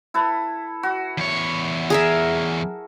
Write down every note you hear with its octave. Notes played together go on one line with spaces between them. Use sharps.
E4 A4 B4
F#4
E2 C#5
G#4 A#4 E5